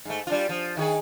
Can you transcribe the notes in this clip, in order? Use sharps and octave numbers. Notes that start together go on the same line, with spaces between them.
G#2 A3
G3 D4 F4
F3
D#3 G4 G#4